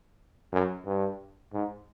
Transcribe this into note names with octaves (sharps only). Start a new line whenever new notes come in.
F#2
G2
G#2